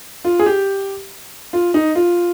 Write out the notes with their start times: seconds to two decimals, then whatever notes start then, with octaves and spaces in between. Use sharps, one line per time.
0.25 F4
0.39 G#4
0.46 G4
1.53 F4
1.74 D#4
1.95 F4